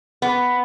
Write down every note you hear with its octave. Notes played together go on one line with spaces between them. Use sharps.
B3